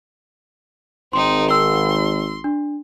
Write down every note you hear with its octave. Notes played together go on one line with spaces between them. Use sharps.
G#1 C4 D#4 C6
C6 E6
D4